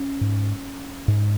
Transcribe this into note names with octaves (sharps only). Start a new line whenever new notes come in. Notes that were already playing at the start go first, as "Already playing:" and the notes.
Already playing: C#4
G#2
G#2